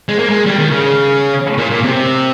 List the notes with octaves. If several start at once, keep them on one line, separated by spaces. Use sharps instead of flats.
G#3
A#3
G#3
G3
D#3
C#3
A#2
A#2
C3